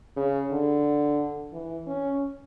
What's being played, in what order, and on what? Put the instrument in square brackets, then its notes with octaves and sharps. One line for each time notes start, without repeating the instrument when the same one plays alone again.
[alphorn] C#3
D3
E3
C#4